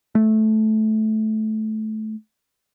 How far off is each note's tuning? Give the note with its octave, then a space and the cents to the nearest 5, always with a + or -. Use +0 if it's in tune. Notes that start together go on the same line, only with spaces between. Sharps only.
A3 -15